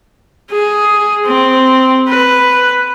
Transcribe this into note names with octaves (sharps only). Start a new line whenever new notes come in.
G#4
C4
B4